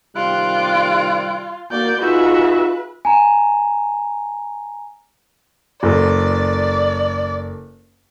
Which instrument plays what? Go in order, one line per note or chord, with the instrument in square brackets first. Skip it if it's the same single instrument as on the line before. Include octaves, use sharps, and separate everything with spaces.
[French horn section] C3 D#3 G3 [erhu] F4 [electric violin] F#6 D7
[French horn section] A#3 [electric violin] F#4 G6 [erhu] D5
[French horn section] D#4 F4 [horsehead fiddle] F#4 E5 [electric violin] G#4 [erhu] B4
[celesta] G#5 A#5
[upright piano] F#1 A4 [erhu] D5